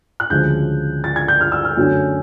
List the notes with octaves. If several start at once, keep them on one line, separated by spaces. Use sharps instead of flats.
F#6
D2 C#3 F3 G#3 G6
A6
G#6
G6
F6
E6
F6
F#2 D3 F#3 A3 C#4